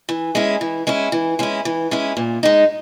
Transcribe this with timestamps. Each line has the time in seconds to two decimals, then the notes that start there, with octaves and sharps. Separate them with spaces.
0.09 E3
0.35 G#3 C#4 E4
0.61 E3
0.87 G#3 C#4 E4
1.12 E3
1.39 G#3 C#4 E4
1.65 E3
1.91 G#3 C#4 E4
2.17 A#2
2.43 G#3 D#4